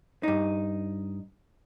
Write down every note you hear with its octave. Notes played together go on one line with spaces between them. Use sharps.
G2 D#4